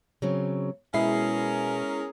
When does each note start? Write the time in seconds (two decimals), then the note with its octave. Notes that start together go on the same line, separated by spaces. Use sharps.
0.22 C#3 F#3 C4
0.94 B2 G#3 C#4 E4 G#4 A#4 C7